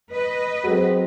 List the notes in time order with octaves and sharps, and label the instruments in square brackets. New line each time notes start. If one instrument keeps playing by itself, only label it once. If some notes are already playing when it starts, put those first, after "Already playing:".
[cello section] B4 D#5
[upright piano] F#3 G#3 C4